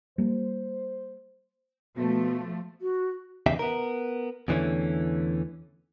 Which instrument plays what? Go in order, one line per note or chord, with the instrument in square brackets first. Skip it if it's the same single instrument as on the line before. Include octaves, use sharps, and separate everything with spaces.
[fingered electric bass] G3 A#3 [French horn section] C5
[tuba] B2 [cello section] F3 A3
[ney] F#4
[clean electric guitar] E2 C#3 D#4 G4 E5
B3 A#4
E2 D3 E3 A3 C#4